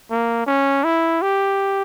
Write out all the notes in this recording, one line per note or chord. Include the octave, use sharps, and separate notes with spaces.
A#3
C#4
E4
G4